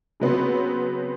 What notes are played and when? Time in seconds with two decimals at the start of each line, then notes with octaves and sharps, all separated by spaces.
0.20 C#3 F#3 B3 C4